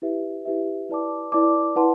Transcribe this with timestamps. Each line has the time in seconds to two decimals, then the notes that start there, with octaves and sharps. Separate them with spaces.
0.02 E4 G4 B4 E5
0.45 E4 G4 B4 E5
0.89 E4 B4 D5 A5 D6
1.32 E4 B4 D5 A5 D6
1.76 E4 B4 F#5 A5 C6